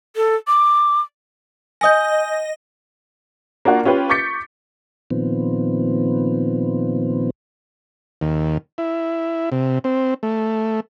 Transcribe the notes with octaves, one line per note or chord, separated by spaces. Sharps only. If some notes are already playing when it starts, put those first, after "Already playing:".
A4
D6
D#5 G#5 D#6 G6 A#6
A#3 D4 F4 F#4
C#4 F4 G4 B4
C#6 D6 G6 A6 B6 C#7
A#2 D#3 F3 B3 C4
D#2
E4
C3
C4
A3